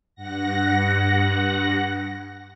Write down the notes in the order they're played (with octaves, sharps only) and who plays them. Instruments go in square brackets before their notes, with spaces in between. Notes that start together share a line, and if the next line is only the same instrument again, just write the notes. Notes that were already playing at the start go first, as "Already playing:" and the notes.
[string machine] G2 F#5 A#6